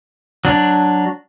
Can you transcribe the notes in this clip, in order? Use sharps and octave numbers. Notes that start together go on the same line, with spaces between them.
F#3 D4